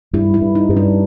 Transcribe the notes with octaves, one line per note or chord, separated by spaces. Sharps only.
G2 E4
E4
G2
D#4
G2 C#4
D4